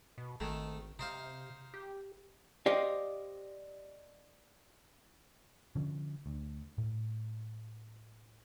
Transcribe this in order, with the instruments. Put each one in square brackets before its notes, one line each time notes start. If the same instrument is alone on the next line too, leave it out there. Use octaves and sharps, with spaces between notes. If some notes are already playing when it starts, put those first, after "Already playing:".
[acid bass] B2
[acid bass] G#1 [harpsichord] D#3 A3
[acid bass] C3 [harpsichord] D#4 C5 F5
[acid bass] G4
[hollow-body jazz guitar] G4 C5 D5 D#5 F5
[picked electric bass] D3 F3 C#4
D2
A2